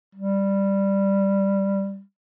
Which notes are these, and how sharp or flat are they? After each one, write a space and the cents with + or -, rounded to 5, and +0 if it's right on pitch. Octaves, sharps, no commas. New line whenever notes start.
G3 +5